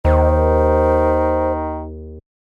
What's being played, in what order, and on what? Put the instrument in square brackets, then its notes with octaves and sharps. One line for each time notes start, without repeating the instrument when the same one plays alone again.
[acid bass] D#2 [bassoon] D#3 [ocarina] C5